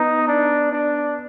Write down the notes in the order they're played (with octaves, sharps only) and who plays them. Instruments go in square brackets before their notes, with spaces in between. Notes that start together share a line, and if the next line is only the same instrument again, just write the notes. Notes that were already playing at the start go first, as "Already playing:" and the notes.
Already playing: [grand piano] B3 [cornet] D#4
[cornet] D4
D4